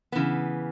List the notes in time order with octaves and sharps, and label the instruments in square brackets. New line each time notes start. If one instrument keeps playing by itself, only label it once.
[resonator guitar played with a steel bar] C#3 E3 B3